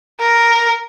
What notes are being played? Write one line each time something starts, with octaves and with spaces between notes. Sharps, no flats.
A#4